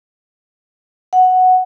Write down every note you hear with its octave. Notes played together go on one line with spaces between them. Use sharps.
F#5